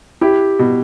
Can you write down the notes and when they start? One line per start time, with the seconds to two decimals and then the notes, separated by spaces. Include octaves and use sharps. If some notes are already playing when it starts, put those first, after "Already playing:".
0.21 E4 G4
0.59 B2